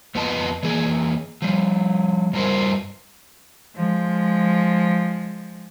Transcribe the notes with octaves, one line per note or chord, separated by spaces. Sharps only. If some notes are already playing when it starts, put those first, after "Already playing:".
F2 B3 F4 B4 D#5 A5
E3 A#3 G#4
F3 G3
G2 G3 F4 A#4 C5
F3 G#3